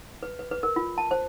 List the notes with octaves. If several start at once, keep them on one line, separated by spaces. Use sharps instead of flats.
B4
B4
B4
A#4
F4
A5
C5